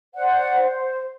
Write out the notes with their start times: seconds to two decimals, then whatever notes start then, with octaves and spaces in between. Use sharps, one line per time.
0.14 C5 D5 F#5
0.61 C5